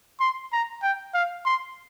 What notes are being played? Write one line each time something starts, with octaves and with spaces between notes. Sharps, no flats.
C6
A#5
G5
F5
C6